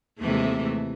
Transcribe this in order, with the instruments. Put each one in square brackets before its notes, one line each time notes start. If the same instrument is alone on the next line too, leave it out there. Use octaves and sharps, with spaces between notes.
[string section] D#2 A3 E5 [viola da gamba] C3 E3 G#3